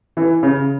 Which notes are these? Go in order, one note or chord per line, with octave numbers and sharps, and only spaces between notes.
E3
C#3